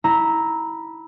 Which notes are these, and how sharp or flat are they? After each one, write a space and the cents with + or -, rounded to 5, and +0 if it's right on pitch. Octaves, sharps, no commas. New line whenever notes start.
E4 -15 A#5 +0